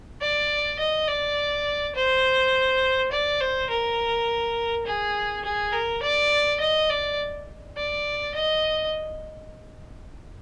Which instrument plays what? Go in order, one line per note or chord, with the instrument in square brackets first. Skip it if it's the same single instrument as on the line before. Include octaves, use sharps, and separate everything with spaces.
[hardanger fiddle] D5
D#5
D5
C5
D5
C5
A#4
G#4
G#4
A#4
D5
D#5
D5
D5
D#5